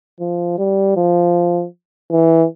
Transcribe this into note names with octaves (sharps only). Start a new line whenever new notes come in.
F3
G3
F3
E3